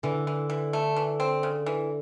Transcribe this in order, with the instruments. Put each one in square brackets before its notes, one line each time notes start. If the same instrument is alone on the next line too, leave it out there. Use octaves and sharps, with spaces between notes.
[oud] D3 [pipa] E3
[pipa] E3
E3
A3
E3
C4
C#3
E3